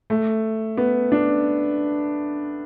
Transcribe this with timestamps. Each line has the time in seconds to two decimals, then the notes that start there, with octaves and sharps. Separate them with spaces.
0.10 A3
0.77 B3
1.12 D4